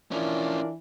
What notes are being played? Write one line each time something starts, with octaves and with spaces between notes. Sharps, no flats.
E3 C#4 D4 E4 F4 A#4